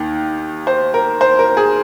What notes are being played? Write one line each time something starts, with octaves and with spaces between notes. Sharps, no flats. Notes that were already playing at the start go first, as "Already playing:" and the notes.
Already playing: D#2 D#3
C5
A#4
C5
A#4
G#4